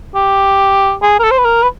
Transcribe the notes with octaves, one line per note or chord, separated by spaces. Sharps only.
G4
G#4
A#4
A4
C5
B4
A#4
B4